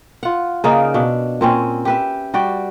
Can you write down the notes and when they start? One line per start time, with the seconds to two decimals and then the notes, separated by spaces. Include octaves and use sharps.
0.23 F4 F#5
0.64 C#3 A#3 D#4 D5
0.94 B2 D4
1.41 A#2 C4 C#4
1.85 G4 B4 E5
2.34 G3 F#4 D5 G5